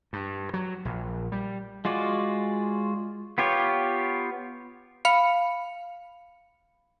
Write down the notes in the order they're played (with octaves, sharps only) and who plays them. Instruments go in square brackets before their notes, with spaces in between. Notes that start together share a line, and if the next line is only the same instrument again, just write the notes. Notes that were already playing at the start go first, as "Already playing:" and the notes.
[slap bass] G2
F#3
A#1
G3
[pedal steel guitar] G#3 F4 F#4 D5
B3 F4 G4 C#5
[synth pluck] F5 B5 C#7